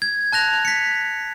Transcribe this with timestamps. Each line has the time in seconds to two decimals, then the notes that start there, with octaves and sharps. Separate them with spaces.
0.02 G#6
0.32 A5 F#6 A#6 F7
0.65 B6 C#7